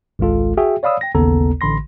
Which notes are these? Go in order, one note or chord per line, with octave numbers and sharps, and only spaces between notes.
G#1 C#2 G#3 F4 A4
F#4 G#4 E5 G5
C#5 D5 F5 B5 D#6 E6
G5 A#6
A1 D#2 C#3 B3 A4 A#5
A1 D3 B5 C6 A#6